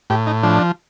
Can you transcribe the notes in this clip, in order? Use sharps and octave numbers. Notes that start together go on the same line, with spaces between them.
A2 G4
D#4
F3 D4